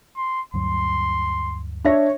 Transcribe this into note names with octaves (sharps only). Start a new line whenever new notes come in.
C6
D2 G2 F#3 C6
D4 C#5 E5 A#6